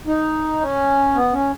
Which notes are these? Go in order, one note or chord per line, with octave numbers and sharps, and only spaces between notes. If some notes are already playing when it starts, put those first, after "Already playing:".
D#4
C#4
B3
C#4